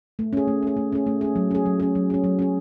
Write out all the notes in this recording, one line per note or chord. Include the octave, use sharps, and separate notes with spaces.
A3
C#4 G#4
A3
C#4 G#4
A3
C#4 G#4
A3
C#4 G#4
F#3
C#4 G#4
F#3
C#4 G#4
F#3
C#4 G#4
F#3
C#4 G#4